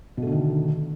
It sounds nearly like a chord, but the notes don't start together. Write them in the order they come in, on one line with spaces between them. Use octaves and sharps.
B2 A3 D3 D#3